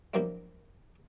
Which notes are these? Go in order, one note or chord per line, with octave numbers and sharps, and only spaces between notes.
F3 F#3 A#3 C4 D4 E4